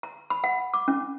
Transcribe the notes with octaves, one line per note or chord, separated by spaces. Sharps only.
A#5
B5
F#5
D6
C#4